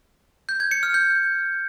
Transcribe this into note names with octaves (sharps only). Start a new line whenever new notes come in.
G6
G#6
C#7
F6
G6